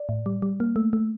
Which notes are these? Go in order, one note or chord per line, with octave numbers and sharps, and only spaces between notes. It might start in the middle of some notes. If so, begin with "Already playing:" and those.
Already playing: D5
A2
G3
G3
A#3
A3
A3